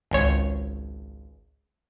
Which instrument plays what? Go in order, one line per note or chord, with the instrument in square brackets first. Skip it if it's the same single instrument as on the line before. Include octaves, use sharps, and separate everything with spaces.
[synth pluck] G#1 C#2 C#5